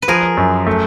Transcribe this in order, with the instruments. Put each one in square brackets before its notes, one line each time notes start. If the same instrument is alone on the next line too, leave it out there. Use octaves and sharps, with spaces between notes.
[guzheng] B4
[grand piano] F3 [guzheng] G#4 A#4
[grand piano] F#2
A3